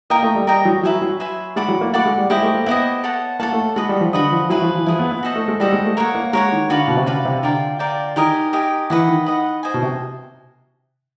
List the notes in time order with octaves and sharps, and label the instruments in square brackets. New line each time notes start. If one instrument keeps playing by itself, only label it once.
[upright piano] A#3 [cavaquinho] A#4 D#5 G5 A#5
[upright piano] A3
G3
[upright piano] G3 [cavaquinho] A#4 D#5 G5 A#5
[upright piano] F#3
[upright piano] F#3 [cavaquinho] B4 E5 G#5 C6
[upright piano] F#3
[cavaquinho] B4 E5 G#5 C6
[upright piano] G#3 [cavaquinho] D5 F#5 B5 D6
[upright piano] F#3
A#3
[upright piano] A3 [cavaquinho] D5 F#5 B5 D6
[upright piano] G#3
G3
[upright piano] G#3 [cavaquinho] E4 G4 C5 D#5
[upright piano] A3
A#3
[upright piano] B3 [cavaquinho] E4 G4 C5 D#5
[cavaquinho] A4 C#5 F#5 A5
[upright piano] A#3 [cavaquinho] A4 C#5 F#5 A5
[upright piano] A3
[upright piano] G#3 [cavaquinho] F#4 B4 D#5
[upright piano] G3
F3
[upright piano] D3 [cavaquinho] F#4 B4 D#5
[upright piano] F3
[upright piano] F#3 [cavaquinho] E4 G#4 B4
[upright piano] F3
E3
[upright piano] F3 [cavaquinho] E4 G#4 B4
[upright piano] B3
B3
[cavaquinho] F#4 A4 C5 D#5
[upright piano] A3
G#3
[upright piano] G3 [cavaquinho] F#4 A4 C5 D#5
[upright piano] G#3
A3
[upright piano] A#3 [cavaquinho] A#4 C#5 F#5
[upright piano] A#3
[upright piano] G#3 [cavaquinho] A#4 C#5 F#5
[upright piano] D#3
[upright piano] D3 [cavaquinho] F#4 B4 D5 F5
[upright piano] B2
C3
[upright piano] C#3 [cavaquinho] F#4 B4 D5 F5
[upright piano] C3
[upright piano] D3 [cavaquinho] F4 A#4 D5 G5
[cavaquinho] F4 A#4 D5 G5
[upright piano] D#3 [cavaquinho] G4 A#4 D#5 G#5
[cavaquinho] G4 A#4 D#5 G#5
[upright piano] E3 [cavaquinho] B4 D#5 F#5
[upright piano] D#3
[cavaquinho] B4 D#5 F#5
C5 D#5 G#5
[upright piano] B2
C3